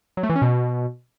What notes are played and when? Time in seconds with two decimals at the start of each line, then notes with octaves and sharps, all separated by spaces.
0.17 F#3
0.23 A3
0.29 E3
0.36 C#4
0.42 B2